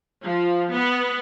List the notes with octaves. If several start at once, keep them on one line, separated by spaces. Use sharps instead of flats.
F3
B3